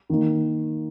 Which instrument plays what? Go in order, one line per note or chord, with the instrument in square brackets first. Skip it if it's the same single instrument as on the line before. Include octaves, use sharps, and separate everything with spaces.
[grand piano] D#3 A#3 D#4